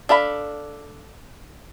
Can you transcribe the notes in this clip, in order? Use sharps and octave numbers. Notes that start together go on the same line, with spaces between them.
D4 A4 F5 B5